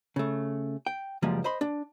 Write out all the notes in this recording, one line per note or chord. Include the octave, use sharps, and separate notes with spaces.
C#3 A3
G5
C#2 F#2 F3 G3 G#3 A#3
C5 D#5 B5 C6
D4